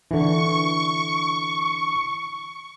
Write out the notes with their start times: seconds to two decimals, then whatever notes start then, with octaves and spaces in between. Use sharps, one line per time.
0.11 D3 E3 C#6